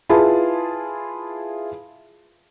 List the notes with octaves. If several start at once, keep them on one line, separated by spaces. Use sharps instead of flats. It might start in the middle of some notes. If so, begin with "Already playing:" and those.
E4 F4 G#4 B4 A5